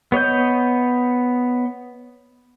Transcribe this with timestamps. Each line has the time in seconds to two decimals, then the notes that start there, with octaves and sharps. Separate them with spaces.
0.12 B3 C#5 D#5 G6